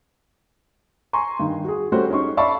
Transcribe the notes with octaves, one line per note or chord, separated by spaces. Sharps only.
G#5 A#5 C6 C#6
G2 D#3
F#4 G#4
G3 A3 C#4 F#4 C5
C#4 D#4 C6 C#6
D5 E5 F5 A5 B5 C#6